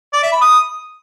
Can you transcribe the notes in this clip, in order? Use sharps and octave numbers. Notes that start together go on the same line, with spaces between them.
D5
E5
B5
D#6